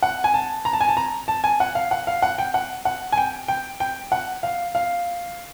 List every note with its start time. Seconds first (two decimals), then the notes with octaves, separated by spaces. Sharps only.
0.03 F#5
0.24 G#5
0.34 A5
0.65 A#5
0.73 A5
0.81 G#5
0.88 A5
0.97 A#5
1.28 A5
1.44 G#5
1.60 F#5
1.75 F5
1.91 F#5
2.07 F5
2.22 F#5
2.38 G5
2.54 F#5
2.85 F#5
3.12 G#5
3.18 G5
3.48 G5
3.80 G5
4.12 F#5
4.43 F5
4.75 F5